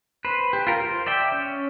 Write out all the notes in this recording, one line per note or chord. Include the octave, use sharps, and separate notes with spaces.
B4 C5
G4
F4 A#4
C5
D5 E5 G5
C#4